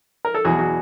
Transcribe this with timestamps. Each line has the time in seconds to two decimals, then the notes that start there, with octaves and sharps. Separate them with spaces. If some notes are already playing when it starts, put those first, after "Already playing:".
0.25 A#4
0.35 A4
0.45 E2 B2 F#3 F#4 G#4
0.59 F#4 G#4